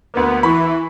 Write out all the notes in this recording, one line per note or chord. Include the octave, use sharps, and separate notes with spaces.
D2 A#3 B3
E3 B5 C#6